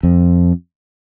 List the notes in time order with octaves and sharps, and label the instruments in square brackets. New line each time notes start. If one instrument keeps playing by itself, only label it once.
[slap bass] F2